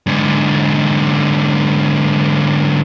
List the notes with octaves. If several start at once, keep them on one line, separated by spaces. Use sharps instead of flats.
G#2 D3